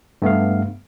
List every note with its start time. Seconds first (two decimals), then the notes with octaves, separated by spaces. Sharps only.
0.22 G2 A3 B3 F5